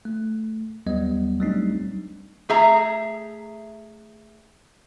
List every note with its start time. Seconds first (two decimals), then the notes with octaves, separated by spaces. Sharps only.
0.05 A3
0.86 D#2 F#3 G3 B3 D#5
1.40 F#3 G3 A3 C4 D4 D#4
2.49 A3 G#4 E5 A#5